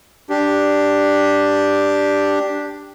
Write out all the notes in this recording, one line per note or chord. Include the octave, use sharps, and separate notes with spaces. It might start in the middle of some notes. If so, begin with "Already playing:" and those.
D4 G4